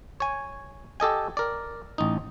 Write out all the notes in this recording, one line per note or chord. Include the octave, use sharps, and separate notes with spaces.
C#5 G#5
G4 A4 D#5 G#5
A#4 D5
A1 D#4